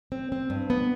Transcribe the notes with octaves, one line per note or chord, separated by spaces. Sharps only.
C4
C4
G2
B3